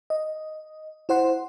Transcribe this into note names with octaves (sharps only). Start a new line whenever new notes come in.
D#5
E4 C5 F#5 C6